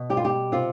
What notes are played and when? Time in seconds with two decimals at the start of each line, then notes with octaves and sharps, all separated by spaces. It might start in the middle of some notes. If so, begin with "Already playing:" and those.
Already playing: B2
0.10 G3 G4
0.17 F4
0.25 G4
0.52 C3 F4